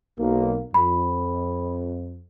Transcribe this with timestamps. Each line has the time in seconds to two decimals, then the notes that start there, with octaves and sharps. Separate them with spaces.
0.20 B1 A#3
0.74 F2 B5